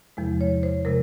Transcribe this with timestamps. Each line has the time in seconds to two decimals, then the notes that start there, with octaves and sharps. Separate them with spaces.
0.17 E2 C3 F3 G#3
0.41 C#5
0.63 C5
0.85 C3 F3 G#3 A#4